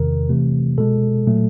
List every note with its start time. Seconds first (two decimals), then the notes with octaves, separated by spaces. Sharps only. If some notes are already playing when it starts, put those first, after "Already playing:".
Already playing: E2 C3 D#3 A#4
0.29 C3 E3 A3
0.78 B2 G#3 A4
1.27 A#2 F#3 A3